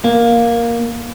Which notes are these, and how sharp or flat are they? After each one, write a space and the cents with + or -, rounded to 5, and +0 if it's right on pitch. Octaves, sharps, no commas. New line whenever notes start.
A#3 +5